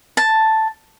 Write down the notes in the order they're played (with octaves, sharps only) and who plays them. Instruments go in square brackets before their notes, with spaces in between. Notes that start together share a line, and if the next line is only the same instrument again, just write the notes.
[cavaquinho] A5